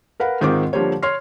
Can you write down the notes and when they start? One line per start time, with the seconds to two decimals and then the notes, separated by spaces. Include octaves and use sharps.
0.20 A#4 B4 F5 F#5
0.41 G#2 D#3 G#3 C4 F4 D6
0.73 D3 F3 G3 A#3 C5 C#5
1.03 C#5 C6 F6 C7